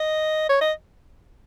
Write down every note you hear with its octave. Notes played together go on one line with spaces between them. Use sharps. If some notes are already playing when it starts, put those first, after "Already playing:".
Already playing: D#5
C#5
D#5